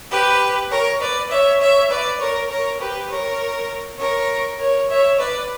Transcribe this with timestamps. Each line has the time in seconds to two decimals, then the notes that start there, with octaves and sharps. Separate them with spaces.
0.10 G4 B4
0.70 A#4 C#5
0.99 B4 D5
1.30 C#5 E5
1.59 C#5 E5
1.90 B4 D5
2.19 A#4 C#5
2.49 A#4 C#5
2.79 G4 B4
3.09 A#4 C#5
3.98 A#4 C#5
4.58 A#4 C#5
4.88 C#5 E5
5.18 B4 D5